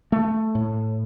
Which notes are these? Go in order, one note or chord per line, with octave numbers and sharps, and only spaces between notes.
A3
A2